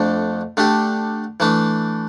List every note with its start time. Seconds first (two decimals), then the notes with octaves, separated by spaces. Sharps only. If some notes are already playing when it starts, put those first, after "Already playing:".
Already playing: F2 D3 A3 D4
0.57 D3 A3 D4 G4
1.40 E3 A3 D4